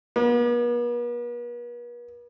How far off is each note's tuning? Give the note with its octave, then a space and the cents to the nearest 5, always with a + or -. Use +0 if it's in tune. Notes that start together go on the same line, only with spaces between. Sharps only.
B3 -45